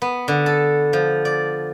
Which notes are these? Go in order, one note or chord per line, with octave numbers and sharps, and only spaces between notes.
B3
D3
A4
F3
D5